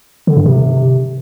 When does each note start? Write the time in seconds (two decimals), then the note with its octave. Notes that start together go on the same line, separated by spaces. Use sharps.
0.27 D3
0.37 G2
0.46 C3